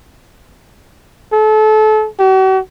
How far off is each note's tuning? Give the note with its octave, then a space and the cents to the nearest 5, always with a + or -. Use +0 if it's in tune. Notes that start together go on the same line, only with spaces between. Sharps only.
A4 -30
F#4 +45